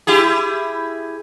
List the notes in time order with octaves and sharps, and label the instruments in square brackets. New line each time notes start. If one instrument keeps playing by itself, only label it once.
[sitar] E4 G4 G#4